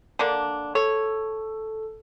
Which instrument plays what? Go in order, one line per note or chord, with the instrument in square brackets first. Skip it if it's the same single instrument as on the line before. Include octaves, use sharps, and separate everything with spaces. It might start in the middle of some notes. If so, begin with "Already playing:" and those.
[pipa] D3 A#3 D4
[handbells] A4 [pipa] C#5